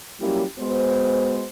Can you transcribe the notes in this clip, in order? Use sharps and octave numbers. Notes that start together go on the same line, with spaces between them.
F#3 G3 A#3 C#4 E4 G4
G#3 B3 F#4 C5